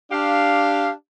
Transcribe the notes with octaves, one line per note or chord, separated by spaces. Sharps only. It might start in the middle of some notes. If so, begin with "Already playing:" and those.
D4 G4 F5